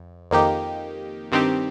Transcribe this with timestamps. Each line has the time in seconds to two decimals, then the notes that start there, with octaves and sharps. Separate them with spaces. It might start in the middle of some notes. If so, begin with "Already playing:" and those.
Already playing: F2
0.31 F2 D#3 A#3 D#4 G4
1.32 G2 D#3 C4 D#4 G4